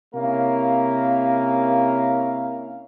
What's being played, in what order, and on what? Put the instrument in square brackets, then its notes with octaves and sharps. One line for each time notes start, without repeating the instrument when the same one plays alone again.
[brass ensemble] C3 A#3 C#4 E4 A#4 F5